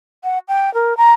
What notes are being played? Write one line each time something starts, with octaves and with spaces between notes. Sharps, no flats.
F#5
G5
A#4
A#5